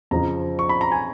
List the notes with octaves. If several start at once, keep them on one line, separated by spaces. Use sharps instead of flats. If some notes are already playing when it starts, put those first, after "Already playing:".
F2 C#3 F3 A#5
C#6
B5
A#5
G#5